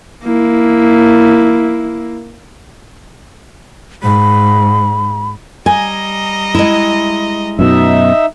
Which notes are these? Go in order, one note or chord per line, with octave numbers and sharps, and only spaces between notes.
A#3 E4
G#2 B5
G3 D#5 G#5 A#5
G#3 E4
F#2 B2 D#4 E5